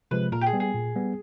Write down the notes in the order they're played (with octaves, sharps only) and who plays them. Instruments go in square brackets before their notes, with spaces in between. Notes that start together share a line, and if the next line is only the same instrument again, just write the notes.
[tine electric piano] C3 F3 G#3 [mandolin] B4
[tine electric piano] A#2 [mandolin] A#4
[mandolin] G4
G#4
[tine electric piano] G3 B3
[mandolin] G#4
[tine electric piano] A#2
G3 B3